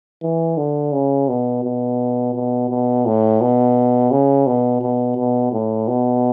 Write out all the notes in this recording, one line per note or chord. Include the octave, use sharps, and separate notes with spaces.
E3
D3
C#3
B2
B2
B2
B2
A2
B2
C#3
B2
B2
B2
A2
B2